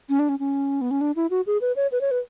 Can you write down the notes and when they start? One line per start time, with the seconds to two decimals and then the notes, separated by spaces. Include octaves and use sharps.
0.10 C#4
0.19 D4
0.29 C#4
0.39 C#4
0.81 B3
0.91 C#4
1.01 D4
1.16 E4
1.31 F#4
1.47 G#4
1.61 B4
1.76 C#5
1.92 B4
2.01 C#5
2.11 B4